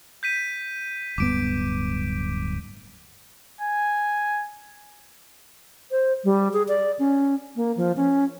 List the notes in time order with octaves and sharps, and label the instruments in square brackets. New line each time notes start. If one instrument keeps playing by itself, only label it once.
[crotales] G6 B6 D#7
[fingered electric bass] D1 G2 B3 [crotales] D6 D7
[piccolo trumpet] G#5
[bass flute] C5
G3
G#4
D5
C#4
A#3
F3
C#4